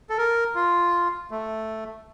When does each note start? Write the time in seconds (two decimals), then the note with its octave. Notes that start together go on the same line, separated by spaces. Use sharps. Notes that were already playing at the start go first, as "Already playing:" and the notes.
0.10 A4
0.18 A#4
0.55 F4
1.31 A3